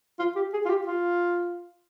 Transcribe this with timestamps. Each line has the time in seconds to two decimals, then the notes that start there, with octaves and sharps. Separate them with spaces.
0.19 F4
0.36 G4
0.53 G#4
0.65 F4
0.69 G4
0.87 F4